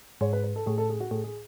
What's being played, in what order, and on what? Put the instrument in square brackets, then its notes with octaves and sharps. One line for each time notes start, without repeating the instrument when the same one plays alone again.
[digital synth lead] G#2 [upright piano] C#5
[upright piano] B4
B4
A4
[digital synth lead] A2 [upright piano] G#4
[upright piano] A4
G#4
F#4
[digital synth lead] A2 [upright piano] G#4
[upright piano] G#4